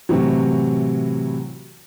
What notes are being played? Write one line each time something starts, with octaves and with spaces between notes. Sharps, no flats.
A2 C3 E3 F#3